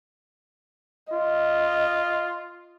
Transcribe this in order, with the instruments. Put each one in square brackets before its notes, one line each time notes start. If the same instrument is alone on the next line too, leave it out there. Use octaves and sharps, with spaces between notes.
[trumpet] F4 [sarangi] D#5